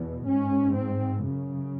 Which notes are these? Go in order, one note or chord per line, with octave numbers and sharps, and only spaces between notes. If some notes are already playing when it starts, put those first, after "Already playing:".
Already playing: E2 B2
G#2 C#4
C4
F#2 C#3